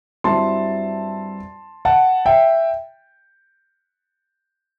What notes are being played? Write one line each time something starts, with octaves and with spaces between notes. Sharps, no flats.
G2 F#3 C4 E4 A5 C6
F#5 A5
E5 G5